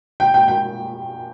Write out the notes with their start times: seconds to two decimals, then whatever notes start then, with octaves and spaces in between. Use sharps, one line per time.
0.20 G5
0.34 G5
0.48 G5